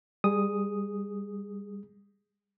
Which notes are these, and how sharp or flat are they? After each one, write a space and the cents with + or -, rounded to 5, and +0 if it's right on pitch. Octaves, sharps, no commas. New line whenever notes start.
G3 +25 G#4 +0 D#6 +0